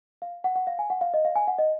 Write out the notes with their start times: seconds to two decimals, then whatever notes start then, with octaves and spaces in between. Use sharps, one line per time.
0.22 F5
0.44 F#5
0.56 F#5
0.67 F5
0.79 G#5
0.90 F#5
1.01 F5
1.14 D#5
1.25 F5
1.36 G#5
1.48 F#5
1.58 D#5